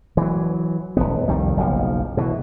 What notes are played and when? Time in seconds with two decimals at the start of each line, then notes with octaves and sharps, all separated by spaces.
0.17 E3 F#3
0.97 D#1 B1 B3
1.28 C2 F2 D#3 G3
1.57 F#1 B1 C3 F3
2.17 B2 E3